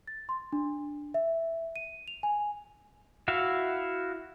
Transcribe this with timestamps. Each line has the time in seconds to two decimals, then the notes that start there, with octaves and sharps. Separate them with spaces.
0.07 A6
0.29 C6
0.52 D4
1.14 E5
1.76 D#7
2.08 F7
2.23 G#5
3.28 E4 F#4 E5 F5